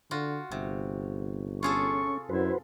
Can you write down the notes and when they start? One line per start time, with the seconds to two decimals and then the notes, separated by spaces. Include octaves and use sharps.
0.11 D3 F4 F#4
0.51 G1 C3
1.63 C#4 F4 G#4 A4 C#6
2.29 F#2 E4 F#4 B4 C5